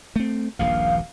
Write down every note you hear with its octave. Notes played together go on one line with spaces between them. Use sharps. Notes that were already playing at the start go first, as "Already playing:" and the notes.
A3 C4
D#1 A#1 G2 F5